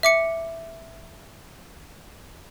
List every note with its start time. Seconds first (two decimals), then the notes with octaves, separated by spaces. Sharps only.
0.03 E5 D6 C#7